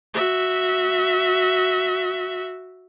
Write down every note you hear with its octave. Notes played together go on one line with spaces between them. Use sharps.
F#4 E5